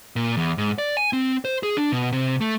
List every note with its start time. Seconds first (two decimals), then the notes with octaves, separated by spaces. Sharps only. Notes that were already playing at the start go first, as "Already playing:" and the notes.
0.16 A#2
0.37 E2
0.58 G#2
0.78 D5
0.97 G#5
1.13 C4
1.45 C5
1.63 G#4
1.77 D4
1.92 B2
2.12 C3
2.41 A3